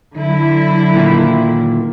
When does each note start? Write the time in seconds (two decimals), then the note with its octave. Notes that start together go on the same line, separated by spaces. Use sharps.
0.17 D3 F#3 E4
0.95 A#2 D#3